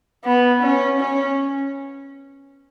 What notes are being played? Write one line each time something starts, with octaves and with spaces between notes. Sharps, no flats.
B3
C#4
C#4